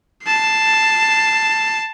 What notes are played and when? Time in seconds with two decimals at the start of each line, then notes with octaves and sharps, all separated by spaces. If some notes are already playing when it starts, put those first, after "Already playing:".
0.25 A5 C7